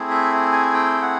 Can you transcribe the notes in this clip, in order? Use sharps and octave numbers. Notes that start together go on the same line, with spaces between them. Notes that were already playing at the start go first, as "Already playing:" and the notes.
Already playing: A3 C4 E4 G#4
E5
G#5
G5
F#5